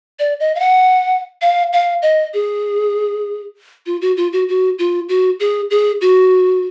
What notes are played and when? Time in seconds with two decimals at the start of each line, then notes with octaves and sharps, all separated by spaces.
0.19 D5
0.40 D#5
0.55 F5
0.60 F#5
1.42 F5
1.73 F5
2.02 D#5
2.34 G#4
3.86 F4
4.01 F#4
4.17 F4
4.33 F#4
4.49 F#4
4.79 F4
5.09 F#4
5.40 G#4
5.70 G#4
6.01 F#4